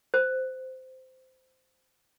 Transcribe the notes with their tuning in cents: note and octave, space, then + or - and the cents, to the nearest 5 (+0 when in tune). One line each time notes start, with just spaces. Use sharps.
C5 -15